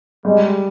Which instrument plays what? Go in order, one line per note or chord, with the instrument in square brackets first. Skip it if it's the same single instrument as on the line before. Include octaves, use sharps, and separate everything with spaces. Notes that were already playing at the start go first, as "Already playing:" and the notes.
[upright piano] G3 [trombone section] G#3